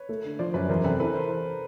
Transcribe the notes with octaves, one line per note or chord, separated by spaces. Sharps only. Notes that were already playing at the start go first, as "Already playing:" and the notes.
Already playing: B4 C#5
A3
D3
F3 C5 D5
F#2 B4 C#5
E2 A#4 C5
C3 A4 B4
E3 A4 B4
A#4 C5